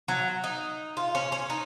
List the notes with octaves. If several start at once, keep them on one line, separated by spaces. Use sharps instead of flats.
F#3
D#4
F4
C#4
C#4
D#4